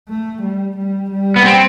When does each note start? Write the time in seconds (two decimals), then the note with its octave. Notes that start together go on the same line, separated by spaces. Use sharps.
0.08 A3
0.43 G3
0.77 G3
1.11 G3
1.36 B3
1.45 C4